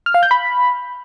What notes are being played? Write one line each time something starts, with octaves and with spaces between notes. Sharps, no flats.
F6
F5
G6
B5